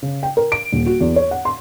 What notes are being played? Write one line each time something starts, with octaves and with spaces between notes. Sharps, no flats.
C#3
G5
A#4
D7
D#1
F#4
E2
C#5
F#5
C6